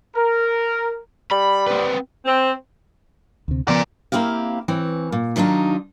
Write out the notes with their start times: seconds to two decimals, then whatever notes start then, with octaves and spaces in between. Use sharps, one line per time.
0.16 A#4
1.31 G3 B5
1.67 C4 B4
2.26 C4
3.48 D2 C3
3.68 C#3 F3 B3 A#4 D5
4.12 A#3 C4 E4 G4 F5
4.68 E3 C4 C#5
5.12 A#2
5.36 D#3 F#3 D4 D#4 F4